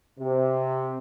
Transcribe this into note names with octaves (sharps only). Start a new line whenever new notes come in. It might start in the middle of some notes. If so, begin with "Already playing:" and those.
C3